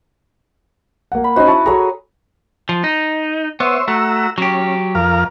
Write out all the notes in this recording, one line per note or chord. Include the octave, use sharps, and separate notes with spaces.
A#3 F#5
B5
C#4 D#4 F#4 C5 G#5
E4 A5 C#6
F#4 G#4 A4 C#5 A#5
F3
D#4
B3 C5 C#5 E5
A3 F#4 A#5 E6
F#3 C#4 G4
F2 A#4 F5